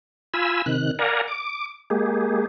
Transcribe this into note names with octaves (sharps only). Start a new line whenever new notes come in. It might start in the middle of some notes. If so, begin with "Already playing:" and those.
F4 G#5 B5 E6
C3 D#3 F#6
A#4 D5 F5 F#5 G#5 A#5
D6
G#3 A#3 G4 G#4